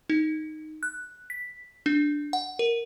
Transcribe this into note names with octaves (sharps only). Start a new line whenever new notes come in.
D#4
F#6
B6
D4
F#5
A#4